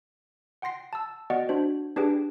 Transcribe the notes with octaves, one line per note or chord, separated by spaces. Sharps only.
F#5 G5 C6 A#6 C7
A5 E6
B3 F#4 D5 D#5 F#5 G5
D4 F#4 C5
D4 G4 G#4 B4 G5